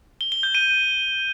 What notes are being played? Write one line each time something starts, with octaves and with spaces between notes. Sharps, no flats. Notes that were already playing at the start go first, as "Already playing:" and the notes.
G7
G7
G6
D#7